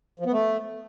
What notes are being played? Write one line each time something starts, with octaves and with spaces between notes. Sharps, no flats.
F3
B3
A3